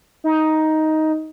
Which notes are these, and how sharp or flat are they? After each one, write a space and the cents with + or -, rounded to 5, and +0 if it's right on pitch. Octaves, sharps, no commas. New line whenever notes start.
D#4 +10